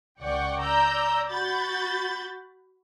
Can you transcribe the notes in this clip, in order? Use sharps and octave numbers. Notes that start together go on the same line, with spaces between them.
C#2 D5 F#5 G5 C#6
D5 A#5 E6 G6
F#4 B5 G6 A6